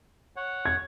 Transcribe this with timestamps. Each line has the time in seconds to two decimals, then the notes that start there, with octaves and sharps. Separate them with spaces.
0.36 C#5 F#5
0.65 G#6